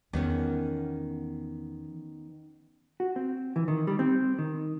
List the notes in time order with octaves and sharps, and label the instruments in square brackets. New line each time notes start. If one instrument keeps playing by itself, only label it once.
[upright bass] E2 [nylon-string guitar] D#3 B3 C#4
[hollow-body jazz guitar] F#4
C4
E3
D#3
G3
C4
D#3